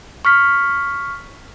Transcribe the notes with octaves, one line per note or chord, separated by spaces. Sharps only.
C#6 F6 B6